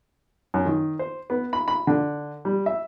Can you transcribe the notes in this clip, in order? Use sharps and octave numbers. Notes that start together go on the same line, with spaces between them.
F#2
D#3
C5
B3
B5
B5
D3
G3
E5